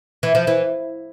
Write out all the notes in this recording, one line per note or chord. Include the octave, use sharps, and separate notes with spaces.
E3
F3
E3